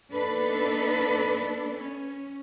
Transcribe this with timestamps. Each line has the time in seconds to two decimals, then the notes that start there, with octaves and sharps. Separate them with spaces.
0.13 A#3 B3 D4 D#4 A4 B4
1.78 C#4